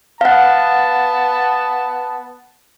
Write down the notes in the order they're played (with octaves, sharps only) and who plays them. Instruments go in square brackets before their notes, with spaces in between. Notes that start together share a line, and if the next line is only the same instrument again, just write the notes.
[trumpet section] B3 A5 [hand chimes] F5 F#5